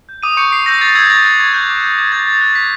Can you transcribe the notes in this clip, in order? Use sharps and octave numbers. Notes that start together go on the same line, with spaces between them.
G6
D6 D#6 D#7
C#6 G6 C#7
C#6 C7
E6 G6 A#6
C#6 A6
E6 G6 G#6
A#6
C#6 A6
F#6
C#6 G#6
F#6 G6
D6
G6
D6 G#6
G6 A6
D#6 A6
F#6
D#6 B6